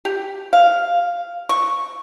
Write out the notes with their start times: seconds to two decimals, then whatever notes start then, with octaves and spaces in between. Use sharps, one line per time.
0.05 G4
0.53 F5
1.49 C#6